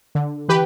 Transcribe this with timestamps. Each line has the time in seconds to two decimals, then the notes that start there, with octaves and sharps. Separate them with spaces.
0.15 D3
0.49 E3 G4 B4